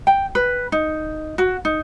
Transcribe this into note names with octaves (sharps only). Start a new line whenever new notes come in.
G5
B4
D#4
F#4
D#4